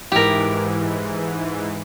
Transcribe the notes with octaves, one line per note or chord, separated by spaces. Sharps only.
G#2 E3 G4 A#4